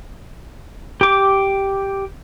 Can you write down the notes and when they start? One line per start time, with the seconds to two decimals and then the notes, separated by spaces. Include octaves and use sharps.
1.01 G4 D6